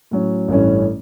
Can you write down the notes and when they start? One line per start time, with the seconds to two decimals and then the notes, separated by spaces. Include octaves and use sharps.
0.11 A2 F#3 C#4
0.48 A1 G2 E3 A3 C#4